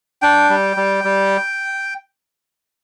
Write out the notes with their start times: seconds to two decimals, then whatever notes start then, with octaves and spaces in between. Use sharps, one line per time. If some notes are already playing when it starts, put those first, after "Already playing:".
0.22 D4 G5
0.49 G3
0.77 G3
1.04 G3